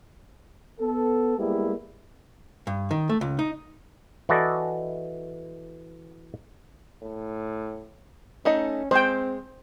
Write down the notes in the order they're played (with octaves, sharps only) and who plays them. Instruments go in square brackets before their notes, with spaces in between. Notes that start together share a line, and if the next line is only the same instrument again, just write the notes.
[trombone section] B3 A4
G3 G#3 A#3 B3 E4 G4
[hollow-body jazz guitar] G2
D#3
A3
C#2
D#4
[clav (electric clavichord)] E3 E4 F#4 A4 D5 D#5
[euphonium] A2
[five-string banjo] A3 D#4 D#5 [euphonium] C#4
[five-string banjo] G#3 [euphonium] C4 [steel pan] C5 G5